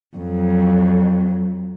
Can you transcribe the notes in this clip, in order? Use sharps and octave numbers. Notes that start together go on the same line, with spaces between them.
F2 F#3